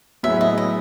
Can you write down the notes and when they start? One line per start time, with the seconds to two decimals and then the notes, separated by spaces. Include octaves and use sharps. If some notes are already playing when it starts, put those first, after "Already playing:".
0.23 A2 F#3 B3 E4 G#4 E5
0.41 D#5
0.58 D#5